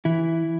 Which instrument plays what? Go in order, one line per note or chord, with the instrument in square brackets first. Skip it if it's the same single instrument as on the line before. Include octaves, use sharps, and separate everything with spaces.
[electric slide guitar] E3 E4